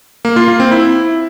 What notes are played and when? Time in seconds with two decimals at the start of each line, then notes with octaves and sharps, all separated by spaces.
0.25 A#3
0.36 F4
0.48 A#3
0.60 C4
0.71 E4